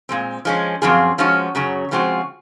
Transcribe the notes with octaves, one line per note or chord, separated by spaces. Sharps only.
A#2 G#3 C4
F3 G#3 C#4
F#2 F3 C4 F4 G#4
F3 G#3 C#4 F#4
F#2 C#3 F#3
C#3 F3 G#3 C4 F#4